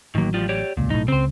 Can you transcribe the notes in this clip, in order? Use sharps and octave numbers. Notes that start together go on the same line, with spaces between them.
A1 D#3 F#3 A#3
F3 G3 F4
G4 C#5 D5
D#1 C#2 A#2
B1 A2 D#4
C#2 C#3 C4 C5